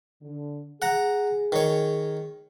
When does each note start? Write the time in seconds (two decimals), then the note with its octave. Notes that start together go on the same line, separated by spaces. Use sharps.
0.22 D3
0.82 G#4 F#5 A#5
1.52 D#3 C#5